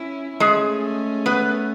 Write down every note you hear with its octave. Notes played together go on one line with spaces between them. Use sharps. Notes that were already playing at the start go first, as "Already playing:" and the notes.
Already playing: C#4 E4
G#3 A3 C#4 G#4
B3 B4